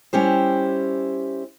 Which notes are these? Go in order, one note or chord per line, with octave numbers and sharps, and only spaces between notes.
G3 C#4 E4 G4 C5